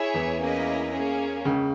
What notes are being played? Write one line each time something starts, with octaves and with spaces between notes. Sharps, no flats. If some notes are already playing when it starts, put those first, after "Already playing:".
Already playing: E4 G#4 C#5 E5 G#5
E2 E3
A#3 C#4 E4 G#4 D#5
A#3 C#4 G#4
C#2 C#3